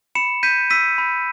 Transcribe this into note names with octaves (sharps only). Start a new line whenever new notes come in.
B5 C#7 E7
G6 B6 D#7
E6 B6 D#7
B5